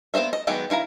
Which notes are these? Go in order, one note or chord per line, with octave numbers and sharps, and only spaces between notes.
A#3 B3 C5 D#5 E5
D#5
D#3 F#3 G#3 B3 G4
D#3 E4 F5 A#5